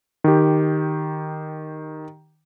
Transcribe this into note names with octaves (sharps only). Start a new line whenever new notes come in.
D#3 G4